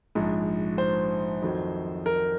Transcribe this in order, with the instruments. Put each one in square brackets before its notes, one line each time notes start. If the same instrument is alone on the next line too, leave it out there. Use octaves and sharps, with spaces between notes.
[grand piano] A#1 G#2 F3
C5
F2 D#3 F#3
A#4